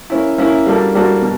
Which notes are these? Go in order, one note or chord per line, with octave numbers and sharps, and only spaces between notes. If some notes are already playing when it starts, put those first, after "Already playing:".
A#3 C#4 E4
A#3 C#4 E4
G3 A#3 D4 F#4 A4
G3 A#3 D4 F#4 A4
B2